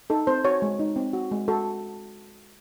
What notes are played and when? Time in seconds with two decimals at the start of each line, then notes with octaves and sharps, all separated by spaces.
0.10 D#4 A4
0.27 C4 C5
0.44 F#4 C#5
0.62 G#3
0.79 D#4
0.96 C4
1.13 F#4
1.31 G#3
1.48 F#4 A4